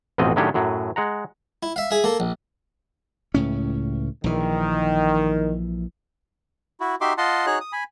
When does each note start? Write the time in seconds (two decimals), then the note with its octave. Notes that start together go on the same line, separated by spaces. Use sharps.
0.18 A1 F2 B2 C4 D#5
0.36 A2 D#3 F#3 C#4 D4 G4
0.54 F#2 A2 F#3
0.96 G#3 F#5 A#5
1.63 E4
1.76 E5 F5
1.91 G#4 E5
2.04 A#3 A4
2.20 A#1
3.34 C#2 A2 C#4
4.24 A#1 D#3 E3
6.80 E4 F#4
7.01 D#4 F#4 G4 E5 C6 D6
7.18 F4 D#5 F#5 A5 C6
7.46 D#4 F#4 G#4 C#5 F#6
7.60 D#6
7.72 G#5 B5